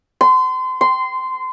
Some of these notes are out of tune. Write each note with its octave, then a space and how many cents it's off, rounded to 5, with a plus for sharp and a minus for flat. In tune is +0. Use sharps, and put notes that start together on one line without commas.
C6 -30
C6 -15